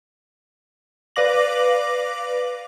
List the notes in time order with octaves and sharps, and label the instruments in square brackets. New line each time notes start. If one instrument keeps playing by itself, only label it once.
[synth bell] B4 D5 F5 D6 A#6 F#7